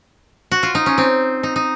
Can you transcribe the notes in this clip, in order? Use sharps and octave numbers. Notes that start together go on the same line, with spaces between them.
F#4
F4
D#4
C#4
C4
D#4
D#4